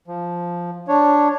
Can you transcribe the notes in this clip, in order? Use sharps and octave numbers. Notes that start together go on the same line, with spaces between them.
F3
D4 C#5